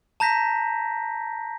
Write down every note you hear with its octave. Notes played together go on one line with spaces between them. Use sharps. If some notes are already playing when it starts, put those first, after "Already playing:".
A5 A#5 G6 A#6 B6